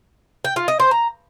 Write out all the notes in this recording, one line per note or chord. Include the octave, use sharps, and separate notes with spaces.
G5
F4
D#5
C5
A#5